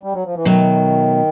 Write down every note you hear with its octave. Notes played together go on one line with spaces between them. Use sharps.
G3
F#3
F3
E3
B2 D#3 F#3 A3